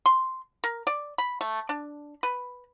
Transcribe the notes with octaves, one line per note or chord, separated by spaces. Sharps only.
C6
A#4
D5
B5
A3
D4
B4